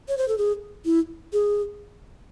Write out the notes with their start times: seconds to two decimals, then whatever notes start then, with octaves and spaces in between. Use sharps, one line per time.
0.08 C#5
0.18 C5
0.28 A4
0.38 G#4
0.85 E4
1.33 G#4